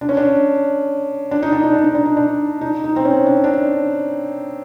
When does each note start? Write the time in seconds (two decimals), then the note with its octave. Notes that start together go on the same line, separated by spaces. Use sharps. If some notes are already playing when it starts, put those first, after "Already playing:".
0.01 D4
0.09 C#4
0.17 D4
1.31 D4
1.42 D#4
1.53 D4
1.63 D#4
1.73 D4
1.84 D#4
1.95 D4
2.05 D#4
2.17 D4
2.61 D#4
2.84 D#4
2.96 C4
3.05 C#4
3.26 D4
3.44 D4